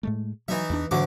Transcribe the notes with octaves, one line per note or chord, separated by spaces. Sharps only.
A2 G#3 A3
E3 F#3 D#4 E5
E2 A3 D4
D2 G#2 E3 F#3 D6